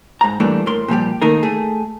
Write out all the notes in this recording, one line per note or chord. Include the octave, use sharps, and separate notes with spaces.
G#2 A#5
G2 E3 A3 A#3 D4
A2 A#4 C6
A#2 F3 G3 G4
D#3 A3 A#3 D#4 A#4
A3 G#4